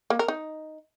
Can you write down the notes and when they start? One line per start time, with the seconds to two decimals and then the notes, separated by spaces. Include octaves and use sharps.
0.10 A#3
0.19 A#4
0.28 D#4